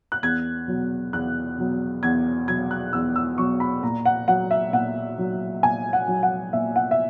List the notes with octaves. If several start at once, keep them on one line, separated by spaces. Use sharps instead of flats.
F#6
E2 G#6
B2 F#3
E2 F#6
B2 F#3
E2 G#6
B2 F#3 G#6
F#6
E2 E6
E6
B2 F#3 C#6
B5
A#2 A#5
F#5
F#3 F#5
E5
A#2 F#5
F#3
A#2 G#5
F#5
F#3
F#5
A#2 E5
F#5
E5